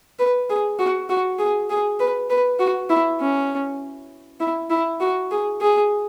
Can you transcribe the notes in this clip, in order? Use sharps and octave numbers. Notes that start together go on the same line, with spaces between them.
B4
G#4
F#4
F#4
G#4
G#4
B4
B4
F#4
E4
C#4
E4
E4
F#4
G#4
G#4